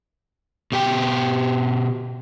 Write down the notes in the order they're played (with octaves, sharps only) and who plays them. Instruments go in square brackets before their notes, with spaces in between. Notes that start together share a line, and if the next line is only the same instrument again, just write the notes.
[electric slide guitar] B2 G4 G5